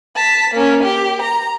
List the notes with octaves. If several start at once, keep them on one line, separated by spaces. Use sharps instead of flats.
A5 B6
A#3 C#4
G4
A#5